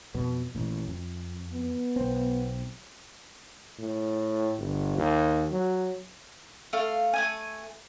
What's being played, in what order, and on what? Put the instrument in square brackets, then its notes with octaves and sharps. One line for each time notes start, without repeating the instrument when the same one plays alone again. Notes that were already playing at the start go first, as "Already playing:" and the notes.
[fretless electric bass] F2 B2 B3
A1 A#2
F2
[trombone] B3
[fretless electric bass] B1 C4
[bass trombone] A2
G1
D#2
F#3
[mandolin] A3 F5
A3 B3 G#5